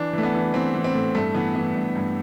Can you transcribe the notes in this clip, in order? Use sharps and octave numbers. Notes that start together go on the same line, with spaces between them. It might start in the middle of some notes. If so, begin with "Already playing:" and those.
Already playing: E3 D4
E3 A3
B3
E3
E3 C4
E3
C4
A2
G2 A3
E3 B3
E3 B3
G2
G2